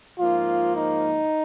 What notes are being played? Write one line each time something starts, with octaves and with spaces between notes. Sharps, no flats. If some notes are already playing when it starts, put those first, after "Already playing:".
G#2 F3 A#3 D#4 F4
D#4